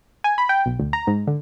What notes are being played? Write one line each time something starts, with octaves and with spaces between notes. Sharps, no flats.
G#5
B5
G5
B1
D2
A#5
G#2
D3